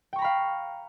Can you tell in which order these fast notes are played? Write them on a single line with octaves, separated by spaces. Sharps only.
G5 C#6 A#5 B5 F5